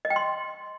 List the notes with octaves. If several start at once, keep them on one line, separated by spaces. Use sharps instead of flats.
D#5
G5
C6